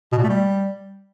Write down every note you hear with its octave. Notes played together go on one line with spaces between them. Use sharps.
B2
A#2
A3
G3